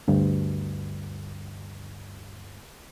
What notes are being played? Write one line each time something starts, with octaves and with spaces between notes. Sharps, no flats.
D2 G2